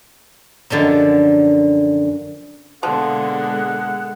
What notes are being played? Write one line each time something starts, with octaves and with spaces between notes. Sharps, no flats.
F#2 D3 F3 F#3
B2 D3 F3 G#3 A#3 A4 F#5